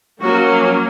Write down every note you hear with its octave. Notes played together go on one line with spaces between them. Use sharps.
F#3 A#3 C#4 F#4